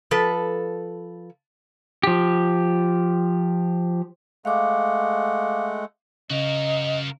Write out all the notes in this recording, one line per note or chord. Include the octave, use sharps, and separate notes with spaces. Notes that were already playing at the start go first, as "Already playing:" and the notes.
F3 A4 B4
F3 G4
G#3 A3 F5 F#5 D6
C#3 F#4 A#4 D#5